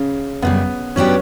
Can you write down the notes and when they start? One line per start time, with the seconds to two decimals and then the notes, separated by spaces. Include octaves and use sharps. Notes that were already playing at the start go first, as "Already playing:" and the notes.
Already playing: C#3
0.42 F#2 C#3 G3 B3
0.96 G2 F#3 B3 C#4 D4 G4